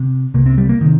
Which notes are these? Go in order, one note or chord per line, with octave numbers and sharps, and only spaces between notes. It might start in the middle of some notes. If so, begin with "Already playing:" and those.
Already playing: C3
C2 C3 A#3
C4
G3
A#3
C3 D#3